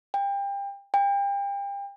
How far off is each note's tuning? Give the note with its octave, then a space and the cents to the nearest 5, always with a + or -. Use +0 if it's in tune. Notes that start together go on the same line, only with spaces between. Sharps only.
G5 +30
G5 +35